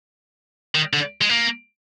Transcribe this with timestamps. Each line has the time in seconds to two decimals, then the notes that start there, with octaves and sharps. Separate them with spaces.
0.75 D#3
0.93 D3
1.21 G#3
1.29 A#3